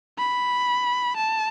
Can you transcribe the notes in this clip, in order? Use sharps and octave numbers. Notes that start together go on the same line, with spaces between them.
B5
A5